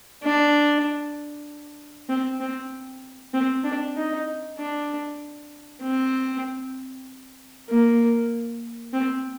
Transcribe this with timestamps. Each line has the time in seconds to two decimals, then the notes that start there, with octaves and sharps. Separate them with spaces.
0.23 D4
2.09 C4
2.40 C4
3.33 C4
3.64 D4
3.96 D#4
4.58 D4
5.82 C4
7.69 A#3
8.93 C4